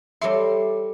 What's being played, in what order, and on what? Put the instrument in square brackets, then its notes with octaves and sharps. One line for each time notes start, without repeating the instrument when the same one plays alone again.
[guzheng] G3 A4 C6 [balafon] C#5 E5